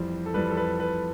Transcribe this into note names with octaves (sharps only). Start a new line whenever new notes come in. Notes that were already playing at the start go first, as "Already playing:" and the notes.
Already playing: F2 E3 G3 C5
A4
F2 E3 G3 B4
A4
B4
B4